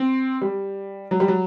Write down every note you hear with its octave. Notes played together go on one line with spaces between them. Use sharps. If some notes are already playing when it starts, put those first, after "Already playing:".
Already playing: C4
G3
F#3
G3
F#3